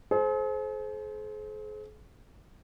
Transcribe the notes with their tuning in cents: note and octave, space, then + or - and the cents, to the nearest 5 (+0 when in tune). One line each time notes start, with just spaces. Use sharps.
G#4 +45 C5 +0